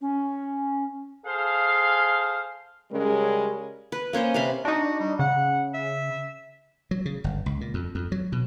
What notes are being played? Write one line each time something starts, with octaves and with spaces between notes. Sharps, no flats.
C#4
G#4 A4 C5 F5
C#3 G3 G#3 C#4 A#4
B4
A#3 C#4 C5 D#5
C3 B4 F5 B5
D4 D#4 F#4
G3
C#3 F#5
E5
F#3
C#3
G1
C#2
A#2
F2
F2
F#3
B2